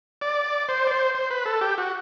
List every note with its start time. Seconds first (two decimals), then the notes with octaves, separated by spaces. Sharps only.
0.21 D5
0.69 C5
0.87 D5
0.91 C5
1.15 C5
1.30 B4
1.46 A4
1.61 G4
1.78 F#4